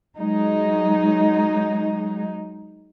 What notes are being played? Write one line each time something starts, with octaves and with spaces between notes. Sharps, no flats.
F#3 G#3 D#4